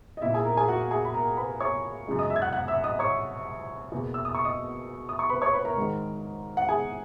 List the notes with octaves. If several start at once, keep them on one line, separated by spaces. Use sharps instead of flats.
D#5
A#2 A#3 E4 E5
G#4 G#5
A#4 A#5
G#4 G#5
F#4 F#5
G#4 G#5
B5
A#4 A#5
B4 B5
C#5 C#6
F#2 C#3 G#3
D#5 D#6
E5 E6
G#6
F#5 F#6
F#5 F#6
E5 E6
D#5 D#6
C#5 C#6
E2 B2 A#3
E6
D#6
C#6
D#5 D#6
D#6
C#6
B4 B5
C#5 C#6
B4 B5
A#4 A#5
G#2 D#3 G#3
F#5
G#4 G#5